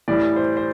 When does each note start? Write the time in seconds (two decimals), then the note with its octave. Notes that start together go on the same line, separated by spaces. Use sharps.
0.08 A2 E3 G3 D5
0.36 C5
0.57 C5